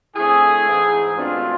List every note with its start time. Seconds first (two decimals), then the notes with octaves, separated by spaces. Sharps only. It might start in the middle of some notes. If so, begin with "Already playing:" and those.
0.15 D3 A3 C4 E4 G#4
0.66 G#2 E3 G#3 C4
1.17 B2 A3 C4 D4 F4